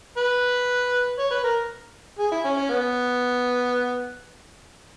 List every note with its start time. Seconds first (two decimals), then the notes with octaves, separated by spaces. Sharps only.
0.18 B4
1.19 C#5
1.31 B4
1.43 A#4
2.19 G#4
2.32 E4
2.44 C#4
2.57 C#4
2.70 B3